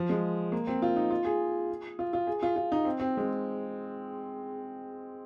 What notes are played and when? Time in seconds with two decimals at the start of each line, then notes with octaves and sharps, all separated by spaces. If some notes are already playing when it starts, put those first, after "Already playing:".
Already playing: F3
0.09 G#3
0.52 A#3
0.67 C4
0.82 F4
0.96 D#4
1.10 F4
1.25 G#4
1.99 F4
2.13 F4
2.27 G#4
2.43 F4
2.56 F4
2.72 D#4
2.85 C4
3.00 C4
3.17 G#3